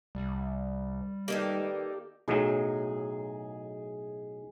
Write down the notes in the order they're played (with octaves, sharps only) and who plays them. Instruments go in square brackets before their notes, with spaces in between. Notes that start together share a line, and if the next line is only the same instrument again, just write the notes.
[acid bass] C2 [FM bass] G3
[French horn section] D#3 B4 D5 [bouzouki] A#3 D#4 A4 [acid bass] G4
[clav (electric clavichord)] B1 A2 F#3 [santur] G#4 D#5